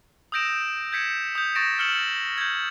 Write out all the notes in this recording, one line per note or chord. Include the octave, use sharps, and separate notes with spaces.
D#6 E6 G6 A#6 D7 E7
G6 G#6 B6 C#7 E7
D#6 G6
C#6 A6 A#6 D7 E7
E6 F6 C#7 E7 F#7
G6 G#6